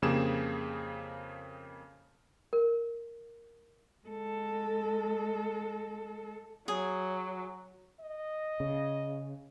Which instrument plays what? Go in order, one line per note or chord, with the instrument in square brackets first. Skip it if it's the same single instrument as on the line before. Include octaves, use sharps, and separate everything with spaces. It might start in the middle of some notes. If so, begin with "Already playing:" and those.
[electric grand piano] F2 C#3 A#3 G4 G#4 E7
[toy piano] A#4
[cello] G#3 A4
[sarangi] F#3 [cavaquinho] G#4
[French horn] D#5
[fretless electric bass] C#3